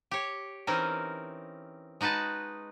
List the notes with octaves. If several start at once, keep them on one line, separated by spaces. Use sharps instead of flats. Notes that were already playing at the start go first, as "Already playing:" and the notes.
G4 C#5
E3 C4 C#4 D#4 A#4
G#3 D#4 F#4 B4 A5